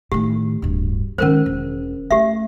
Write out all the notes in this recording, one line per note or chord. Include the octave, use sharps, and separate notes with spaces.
A2 D#3 G4
D1 G2
D#3 G#3 C#4 A#4 C5
E1
A3 G4 E5